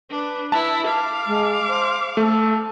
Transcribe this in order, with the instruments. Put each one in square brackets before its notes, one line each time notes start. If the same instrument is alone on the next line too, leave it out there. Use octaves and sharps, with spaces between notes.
[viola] D4 [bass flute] B4
[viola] E4 [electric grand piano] A5
[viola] F5 D6
[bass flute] G#3
C5
[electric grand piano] A3 [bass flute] A4